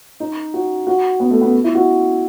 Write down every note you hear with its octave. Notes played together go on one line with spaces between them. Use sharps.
D#4
F#4
F#4
B3
A3
B3
E4
F#4